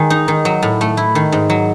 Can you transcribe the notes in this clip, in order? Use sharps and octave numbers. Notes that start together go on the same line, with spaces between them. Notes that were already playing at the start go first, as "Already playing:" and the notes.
Already playing: D#3 G#3
D#4
D#3
F#3
A2
A3
E4
D#3
G#2
F#3